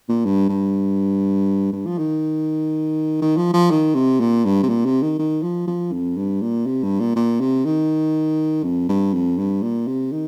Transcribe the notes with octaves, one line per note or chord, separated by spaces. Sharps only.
A#2
G2
G2
G2
F3
D#3
D#3
F3
F3
D#3
C3
A#2
G2
C3
A#2
C3
D#3
D#3
F3
F3
F2
G2
A#2
C3
G2
A#2
A#2
C3
D#3
F2
G2
F2
G2
A#2
C3
D#3